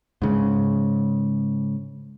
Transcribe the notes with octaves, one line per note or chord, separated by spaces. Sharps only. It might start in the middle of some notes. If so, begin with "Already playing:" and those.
G#2 C#3 G#3